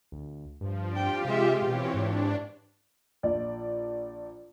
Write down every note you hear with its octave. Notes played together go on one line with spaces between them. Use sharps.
D2
G2 F3
D4 F4 G4 G5
C3 G#3 E5
B2 E3 C4 G4 C#5
G#2 D4
A#1 D5